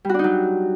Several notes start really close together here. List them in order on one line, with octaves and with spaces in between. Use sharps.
G3 F#4 D4 D#4 F#3